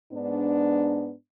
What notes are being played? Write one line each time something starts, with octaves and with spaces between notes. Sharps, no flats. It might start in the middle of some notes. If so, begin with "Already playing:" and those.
G#2 B3 D4